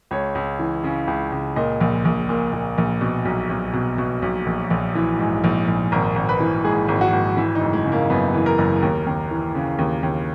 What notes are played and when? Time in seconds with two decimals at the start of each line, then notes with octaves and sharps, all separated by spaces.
0.11 C#2 C#5
0.35 C#2
0.59 E3
0.84 C#3
1.07 C#2
1.32 C#2
1.56 A#2 D#5
1.81 A#1
2.05 A#1
2.29 A#2
2.52 A#2
2.78 A#1
3.01 B2
3.25 B1
3.50 B1
3.73 B2
3.98 B2
4.22 B1
4.46 A#1
4.70 A#1
4.95 E3
5.19 G#2
5.44 A#1
5.68 A#1
5.92 G#1 A#4
6.16 G#1
6.29 B4
6.40 E3
6.64 G#2 G#4
6.88 G#1
7.01 F#4
7.13 G#1
7.37 E3 E4
7.55 D#4
7.61 F#1
7.73 G#3
7.85 C#3
7.92 A#3
8.10 F#2 B3
8.34 E3
8.46 A#4
8.58 F#1
8.82 D#2
9.07 D#2
9.31 E3
9.55 C#3
9.79 D#2
10.03 D#2